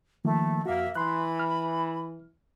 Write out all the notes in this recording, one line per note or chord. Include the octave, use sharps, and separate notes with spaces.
D#3 F3 A3 A#3
F2 A#3 F#4 E5
E3 B5 C6 F#6
F6